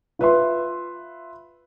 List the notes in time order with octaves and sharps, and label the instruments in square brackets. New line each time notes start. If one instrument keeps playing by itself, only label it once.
[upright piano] F4 B4 E5 C6